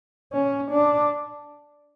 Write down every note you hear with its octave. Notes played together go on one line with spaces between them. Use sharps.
C#4
D4